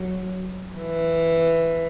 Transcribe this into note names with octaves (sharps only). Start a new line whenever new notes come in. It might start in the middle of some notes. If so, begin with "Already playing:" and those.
Already playing: F#3
E3